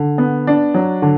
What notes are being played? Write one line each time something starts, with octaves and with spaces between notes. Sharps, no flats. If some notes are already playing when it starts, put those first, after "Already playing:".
Already playing: D3
B3
D4
F#3
D3